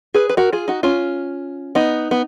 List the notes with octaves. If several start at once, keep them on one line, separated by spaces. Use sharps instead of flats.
G#4 B4
B4
F#4 A#4
F4 G#4
D#4 F#4
C#4 F4
B3 D#4
B3